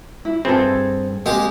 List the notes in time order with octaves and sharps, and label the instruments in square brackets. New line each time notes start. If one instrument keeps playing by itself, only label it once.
[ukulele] E4
[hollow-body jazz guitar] G2 B4 [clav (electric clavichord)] C4 [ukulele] G#4 A4
[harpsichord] G#3 G4 [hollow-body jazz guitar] A#3 C4